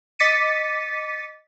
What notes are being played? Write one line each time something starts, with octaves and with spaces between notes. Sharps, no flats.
D#5 D6 A6 B6 C#7 D#7